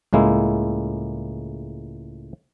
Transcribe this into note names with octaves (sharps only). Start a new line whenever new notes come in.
C#2 A2 G#3 A#3 E4